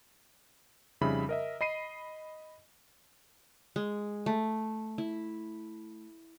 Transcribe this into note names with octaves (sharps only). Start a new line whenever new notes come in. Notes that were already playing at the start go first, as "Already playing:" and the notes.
F2 C#3 G3 D#4 E5 B5
A#4 D#5 E5
D#5 B5 C7 D#7
G#3
A3
E4